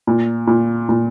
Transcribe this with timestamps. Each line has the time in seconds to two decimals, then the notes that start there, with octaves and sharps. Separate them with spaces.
0.07 A#2
0.47 A#2
0.89 A#2